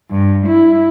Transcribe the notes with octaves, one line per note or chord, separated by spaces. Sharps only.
G2
E4